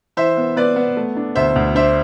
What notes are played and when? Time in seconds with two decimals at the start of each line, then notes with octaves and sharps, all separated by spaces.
0.17 E3 C5 E5
0.37 B3
0.56 B3 B4 D5
0.76 B3
0.97 A3
1.17 D4
1.35 D2 C5 E5
1.56 D2
1.75 D4 C5 E5